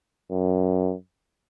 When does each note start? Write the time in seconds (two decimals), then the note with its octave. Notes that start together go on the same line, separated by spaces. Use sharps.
0.30 F#2